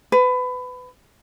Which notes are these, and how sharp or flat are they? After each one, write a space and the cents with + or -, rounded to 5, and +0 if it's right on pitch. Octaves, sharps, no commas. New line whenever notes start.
B4 +25